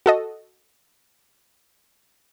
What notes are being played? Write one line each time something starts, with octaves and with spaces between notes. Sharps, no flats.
F#4 A4 D#5